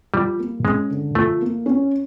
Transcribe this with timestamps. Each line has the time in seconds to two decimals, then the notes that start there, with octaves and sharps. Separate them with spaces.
0.14 F3 G3
0.39 A#3
0.64 G#3 C#4
0.90 D3
1.15 F3 A3
1.41 A#3
1.66 C#4